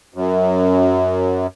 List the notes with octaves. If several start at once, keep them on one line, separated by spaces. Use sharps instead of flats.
F#2